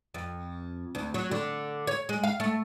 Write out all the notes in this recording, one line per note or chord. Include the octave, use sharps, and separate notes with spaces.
F2
D2
F#3
D3
C#5
G#3
F5
A3